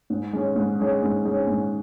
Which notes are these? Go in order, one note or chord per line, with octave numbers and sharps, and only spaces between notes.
G#2
G#3 C#4
G#2
G#3 C#4
G#2
G#3 C#4
G#2